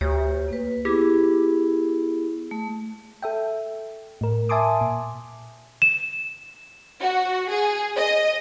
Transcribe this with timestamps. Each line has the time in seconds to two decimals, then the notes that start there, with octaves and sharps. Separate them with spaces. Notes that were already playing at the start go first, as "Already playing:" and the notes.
0.01 D2 G4 C#5
0.48 A#3 B4
0.85 B3 E4 G4 G#4
2.51 A3
3.22 A4 E5 G5
4.21 A2 A#4
4.49 E5 G#5 A5 C6 D6 D#6
4.81 A#2
5.82 E7
7.00 F#4
7.50 G#4
7.97 D#5